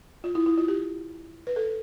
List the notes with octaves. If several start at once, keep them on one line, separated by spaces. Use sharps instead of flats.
F4
E4
E4
F4
G4
B4
A4